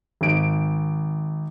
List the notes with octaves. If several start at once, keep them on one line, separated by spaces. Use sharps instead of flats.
G#1 D7